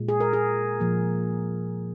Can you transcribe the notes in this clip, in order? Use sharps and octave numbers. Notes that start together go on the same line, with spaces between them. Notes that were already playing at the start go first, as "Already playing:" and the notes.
Already playing: A#2 G#3
G#4
A#4
G#4
A#2 F3 A#3